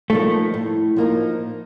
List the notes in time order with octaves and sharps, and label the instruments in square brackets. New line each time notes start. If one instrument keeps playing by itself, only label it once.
[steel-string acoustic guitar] F3 A#3 D#4 [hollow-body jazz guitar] A3
[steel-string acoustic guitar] A2
F3 A#3 D#4